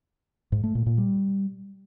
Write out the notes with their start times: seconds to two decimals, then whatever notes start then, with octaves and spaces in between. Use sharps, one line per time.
0.52 G#2
0.64 A3
0.75 A#2
0.86 A#2
0.98 G3